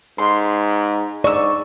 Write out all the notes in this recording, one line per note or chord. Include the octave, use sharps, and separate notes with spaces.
G#2 C6
G#2 D5 C#6 E6